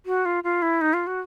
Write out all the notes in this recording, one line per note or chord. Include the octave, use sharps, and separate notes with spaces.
F#4
F4
F4
E4
D#4
F4
F#4